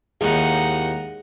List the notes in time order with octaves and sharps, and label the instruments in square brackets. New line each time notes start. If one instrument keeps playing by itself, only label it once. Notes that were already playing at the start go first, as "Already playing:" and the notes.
[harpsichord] D#2 A2 [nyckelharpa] D#4 F#5 [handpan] G#4